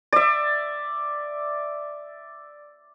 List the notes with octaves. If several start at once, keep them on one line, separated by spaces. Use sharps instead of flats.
D5 E5